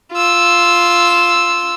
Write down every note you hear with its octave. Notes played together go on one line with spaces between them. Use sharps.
F4 E6